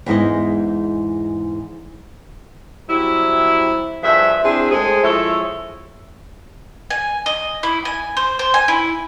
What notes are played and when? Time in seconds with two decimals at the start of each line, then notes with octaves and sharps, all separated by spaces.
0.06 E2 G#2 G#3 E4 D#5
2.89 F#3 G3 C4 E4
4.03 G2 F3 G#4 E5
4.44 C4 D4 E4 G#4
4.71 G#3 A3 C4 G#4
5.03 F3 G#3 E4 A4 C#5 E5
6.90 G#5
7.26 D#5
7.63 E4
7.85 G#5
8.17 C5
8.39 C5
8.54 G#5
8.68 E4